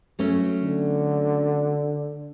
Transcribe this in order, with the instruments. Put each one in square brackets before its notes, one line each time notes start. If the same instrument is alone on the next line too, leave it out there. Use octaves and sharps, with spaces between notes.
[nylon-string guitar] F#3 A3 C#4
[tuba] D3